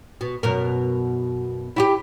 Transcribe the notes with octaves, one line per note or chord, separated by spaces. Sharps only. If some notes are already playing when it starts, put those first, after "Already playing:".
B2
F#2 B2 A#4
E4 F#4 G4